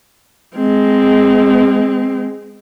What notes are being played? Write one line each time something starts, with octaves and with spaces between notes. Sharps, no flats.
G#3 C4